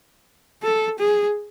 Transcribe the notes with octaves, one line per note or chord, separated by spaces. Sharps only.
A4
G#4